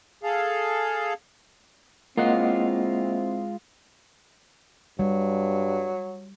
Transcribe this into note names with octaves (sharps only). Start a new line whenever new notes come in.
G#4 A4 F5
G#3 A#3 C4 E4 F4 D#5 F#5
G2 F#3 G3